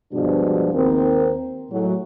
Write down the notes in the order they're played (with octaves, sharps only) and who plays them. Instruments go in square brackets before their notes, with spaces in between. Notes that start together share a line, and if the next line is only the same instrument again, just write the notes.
[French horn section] G2 B2 F3 G#3 D4
D#2 C4 A#4
A2 F#3 G#3